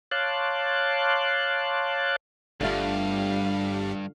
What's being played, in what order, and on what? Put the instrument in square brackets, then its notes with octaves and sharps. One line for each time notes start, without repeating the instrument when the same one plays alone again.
[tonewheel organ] C#5 F5 A5 C6 D6 F#6
[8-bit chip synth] G1 G3 [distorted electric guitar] E2 G2 [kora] D3 A3 F4 [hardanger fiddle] F5